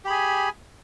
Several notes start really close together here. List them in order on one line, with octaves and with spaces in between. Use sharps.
G4 B5 G#4 G#5